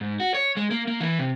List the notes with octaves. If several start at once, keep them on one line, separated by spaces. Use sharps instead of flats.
G#2
F#4
C#5
G#3
A#3
A#3
E3
C3